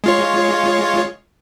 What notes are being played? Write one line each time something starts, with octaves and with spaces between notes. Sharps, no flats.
G#3 F4 C#5